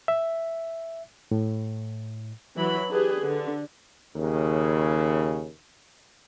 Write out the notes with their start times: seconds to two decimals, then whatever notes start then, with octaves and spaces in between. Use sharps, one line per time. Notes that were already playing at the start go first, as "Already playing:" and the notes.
0.08 E5
1.31 A2
2.56 E3 F#3 B5
2.90 D4 G4 G#4 B4
3.24 D3
4.16 D#2 C#3